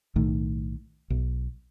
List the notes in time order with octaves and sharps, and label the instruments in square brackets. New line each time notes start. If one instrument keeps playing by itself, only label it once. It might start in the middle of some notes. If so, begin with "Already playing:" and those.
[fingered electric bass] B1 A2 D#3
B1